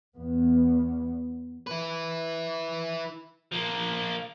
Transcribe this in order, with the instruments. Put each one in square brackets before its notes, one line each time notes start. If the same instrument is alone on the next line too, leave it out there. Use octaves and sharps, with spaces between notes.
[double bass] E2 B3
[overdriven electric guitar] E4 B4
[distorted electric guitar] F3 A#3